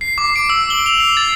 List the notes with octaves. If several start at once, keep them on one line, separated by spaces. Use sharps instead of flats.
C7
D6
D7
E6
G7
F7
C7
A6